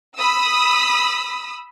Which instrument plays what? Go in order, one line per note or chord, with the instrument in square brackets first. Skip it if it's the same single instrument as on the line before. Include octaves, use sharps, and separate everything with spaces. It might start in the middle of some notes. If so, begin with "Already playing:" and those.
[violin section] B5 D#6 E6